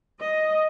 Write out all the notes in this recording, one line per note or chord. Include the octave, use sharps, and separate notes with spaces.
D#5